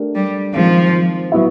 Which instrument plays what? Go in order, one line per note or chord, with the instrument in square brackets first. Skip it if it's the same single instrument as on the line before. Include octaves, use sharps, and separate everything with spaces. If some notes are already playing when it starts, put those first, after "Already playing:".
Already playing: [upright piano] A3 D4 G4 A#4
[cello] G3
[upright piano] D#3 G#3 C4 [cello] F3
[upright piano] F#3 B3 E4